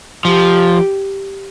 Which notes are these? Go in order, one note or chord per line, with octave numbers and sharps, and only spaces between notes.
F3 G4